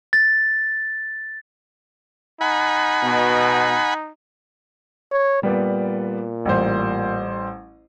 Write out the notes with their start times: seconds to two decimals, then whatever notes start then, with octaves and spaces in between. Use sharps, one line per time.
0.13 A6
2.41 D#4 F#5 G#5 B5
3.03 B2
5.12 C#5
5.43 A#2 G3 B3 D5
6.45 A1 G3 C5